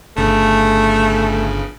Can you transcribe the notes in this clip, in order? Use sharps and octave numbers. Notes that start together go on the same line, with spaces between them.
G1 C#3 A3